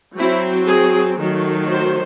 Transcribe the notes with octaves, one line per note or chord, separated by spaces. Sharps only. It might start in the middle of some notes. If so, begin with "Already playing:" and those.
F#3 C4 E4
G#4
D#3 F#3 A3
C5